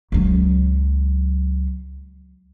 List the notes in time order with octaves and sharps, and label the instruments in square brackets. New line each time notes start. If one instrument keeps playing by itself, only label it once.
[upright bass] C#2 F#3